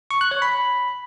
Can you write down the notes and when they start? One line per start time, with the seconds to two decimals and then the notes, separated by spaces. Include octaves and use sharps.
0.11 C#6
0.21 F#6
0.31 C#5
0.42 B5